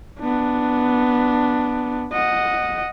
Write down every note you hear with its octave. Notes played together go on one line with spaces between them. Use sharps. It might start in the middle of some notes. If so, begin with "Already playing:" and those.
B3 D4
D#5 F#5